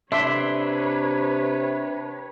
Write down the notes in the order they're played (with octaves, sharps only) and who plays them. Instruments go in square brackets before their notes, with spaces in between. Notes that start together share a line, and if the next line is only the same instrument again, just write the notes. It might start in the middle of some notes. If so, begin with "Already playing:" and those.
[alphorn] C3 [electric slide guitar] D4 [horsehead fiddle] B4 C#5 [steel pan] E5 C6